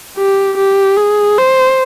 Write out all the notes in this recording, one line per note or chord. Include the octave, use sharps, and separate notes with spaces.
G4
G4
G#4
C5